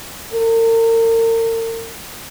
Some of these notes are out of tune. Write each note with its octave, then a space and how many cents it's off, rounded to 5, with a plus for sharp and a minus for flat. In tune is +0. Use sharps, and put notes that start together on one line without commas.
A#4 -40